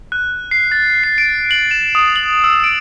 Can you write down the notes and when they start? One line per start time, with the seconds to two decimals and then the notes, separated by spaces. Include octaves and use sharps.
0.12 F#6
0.51 C7
0.72 A6
1.04 C7
1.18 D7
1.51 F#7
1.71 E7
1.95 D#6
2.16 F#7
2.44 E6
2.64 D7